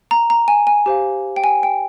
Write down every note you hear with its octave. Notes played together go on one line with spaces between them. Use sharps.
A#5
A#5
G#5
G#5
G4 C5 F5
G5
G#5
G5